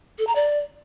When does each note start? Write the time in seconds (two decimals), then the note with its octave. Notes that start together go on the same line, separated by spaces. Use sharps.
0.19 A4
0.27 A#5
0.35 D5